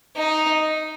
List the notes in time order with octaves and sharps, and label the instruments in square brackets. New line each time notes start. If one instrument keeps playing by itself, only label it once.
[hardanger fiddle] D#4